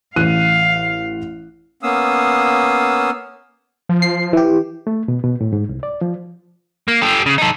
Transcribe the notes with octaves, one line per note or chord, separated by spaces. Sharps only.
A1 F5 F#6 D#7
A#3 B3 C#4 F5 D#6 E6
F3
C7
E3 G4
A3
B2
B2
A2
G#2
C2
D5
F3
A#3
G4 A4
C#3
D#4 A4